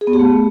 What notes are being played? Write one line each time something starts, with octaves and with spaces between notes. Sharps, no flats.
G#4
B3
G4
A3